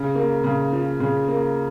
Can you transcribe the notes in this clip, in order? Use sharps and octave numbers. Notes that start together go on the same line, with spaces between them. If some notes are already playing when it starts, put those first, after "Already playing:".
Already playing: C#3
A#3
C#3
F3
C#3
A#3